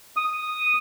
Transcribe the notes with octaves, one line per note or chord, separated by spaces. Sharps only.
D#6